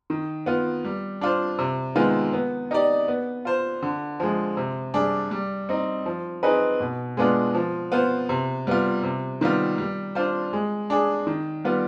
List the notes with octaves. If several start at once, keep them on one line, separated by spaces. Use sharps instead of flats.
D#3
B3 F4
G3
D4 F4 C5
C3
D#3 G#3 B3 F4
B3
D#4 G4 D5
B3
F4 C5
D3
F3 G#3
C3
G3 D4 G#4
G3
C4 D#4
F3
C4 D#4 G#4 B4
B2
G#3 B3 D4 F4
F3
B3 F4 C5
C3
G3 B3 F4
C3
D#3 G3 B3 F4
G3
D4 F4 C5
G#3
D4 G#4
D#3
G3 B3 F4